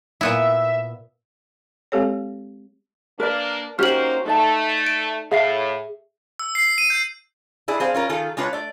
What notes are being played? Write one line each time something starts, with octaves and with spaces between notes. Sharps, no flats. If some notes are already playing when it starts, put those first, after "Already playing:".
A#2 B3 E4 E5
G#3 C4 G4 A4 C#5
A#3 D4 A#4 B4 D5
A#3 C#4 D#4 F#4 G4 C5 F6 F#7
A3 D#4 D5 A5
D7
A2 G#4 E5 F5 C7
E6
C7
D#7
G6
D4 E4 G#4 D5
C4 G#4 C5 F5
C#4 F4 A#4
D#3 F4 G#4 A4
G#3 D4 F4 B4 C#5
A3 D5